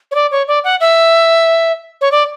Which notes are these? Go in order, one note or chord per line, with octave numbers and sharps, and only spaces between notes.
C#5
D5
C#5
D5
F#5
E5
C#5
D5